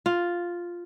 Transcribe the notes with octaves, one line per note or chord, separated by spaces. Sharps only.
F4